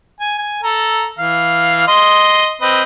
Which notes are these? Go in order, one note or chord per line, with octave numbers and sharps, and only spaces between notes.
G#5
G#5
A4 A#5
E3 F5
D#5 C6
C4 B4 D#5